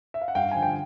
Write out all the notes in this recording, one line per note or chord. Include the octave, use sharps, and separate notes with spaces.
E5
F5
F#5
G2 F5 G5
D3 F3 G#5
G5